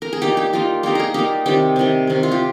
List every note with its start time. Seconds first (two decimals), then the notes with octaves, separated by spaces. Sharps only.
0.02 A#4
0.13 G#4
0.22 G3 A#3 D#4 G4
0.37 G4
0.53 G3 A#3 D#4 F4
0.83 G3 A#3 D#4 G4
0.95 G#4 A#4
1.14 G3 A#3 D#4 G4
1.46 C3 D#3 G3 G4
1.76 C3 D#3 G3
2.07 C3 D#3 G3
2.23 F4
2.31 G4